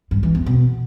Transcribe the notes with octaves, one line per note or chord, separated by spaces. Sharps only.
G2
E3
E2
B2